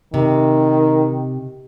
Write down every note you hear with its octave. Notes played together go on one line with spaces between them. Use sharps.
C3 D#3